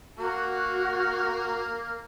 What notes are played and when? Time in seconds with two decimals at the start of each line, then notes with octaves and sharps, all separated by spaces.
0.18 A#3 F#4 A#4